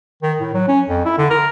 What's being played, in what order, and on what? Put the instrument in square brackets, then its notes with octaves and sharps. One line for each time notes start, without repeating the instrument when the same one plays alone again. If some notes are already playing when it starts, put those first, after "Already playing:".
[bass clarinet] D#3
A2
F#3
C#4
F2
E4
D3
A#4